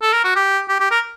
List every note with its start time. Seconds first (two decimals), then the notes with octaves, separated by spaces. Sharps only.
0.02 A4
0.13 A#4
0.24 F#4
0.36 G4
0.69 G4
0.80 G4
0.91 A#4